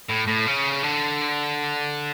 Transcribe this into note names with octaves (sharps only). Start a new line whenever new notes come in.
A2
A2
C#3
D3